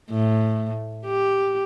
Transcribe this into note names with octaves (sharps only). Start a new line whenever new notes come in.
A2
G4